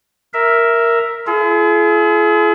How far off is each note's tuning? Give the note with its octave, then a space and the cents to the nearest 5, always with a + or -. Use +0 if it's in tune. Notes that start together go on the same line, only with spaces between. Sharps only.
A#4 +0 E5 +0
F4 -45 G#4 +40